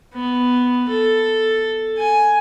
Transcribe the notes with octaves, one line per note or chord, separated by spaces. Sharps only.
B3
A4
G#5